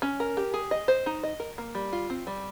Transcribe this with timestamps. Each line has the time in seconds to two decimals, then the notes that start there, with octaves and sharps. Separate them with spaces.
0.02 C#4
0.20 A#4
0.37 G4
0.54 G#4
0.71 D#5
0.88 C5
1.06 D#4
1.24 D#5
1.40 A#4
1.58 A#3
1.75 G3
1.93 F4
2.10 C4
2.27 G3